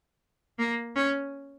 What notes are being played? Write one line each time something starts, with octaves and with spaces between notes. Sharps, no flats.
A#3
C#4